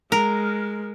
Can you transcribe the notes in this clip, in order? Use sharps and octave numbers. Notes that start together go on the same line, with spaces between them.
G#3 A#4